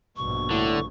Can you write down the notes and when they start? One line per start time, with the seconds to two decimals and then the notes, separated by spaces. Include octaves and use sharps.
0.17 A#1 G2 B2 C#6
0.50 A2 D3